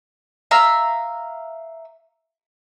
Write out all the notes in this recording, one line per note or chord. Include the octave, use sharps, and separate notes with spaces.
E5 F5 A#5 E6